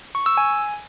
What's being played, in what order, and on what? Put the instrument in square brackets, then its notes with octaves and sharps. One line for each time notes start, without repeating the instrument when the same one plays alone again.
[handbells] C#6
E6
G#5